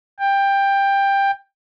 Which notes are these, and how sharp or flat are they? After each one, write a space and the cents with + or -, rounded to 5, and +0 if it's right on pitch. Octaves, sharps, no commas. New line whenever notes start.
G5 +15